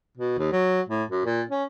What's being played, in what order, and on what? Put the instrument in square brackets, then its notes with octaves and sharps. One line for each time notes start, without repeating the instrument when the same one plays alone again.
[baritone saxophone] B2
D#2
F#3
A2
F#2
A#2
C#4